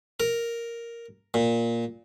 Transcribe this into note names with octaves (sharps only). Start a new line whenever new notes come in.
A#4
A#2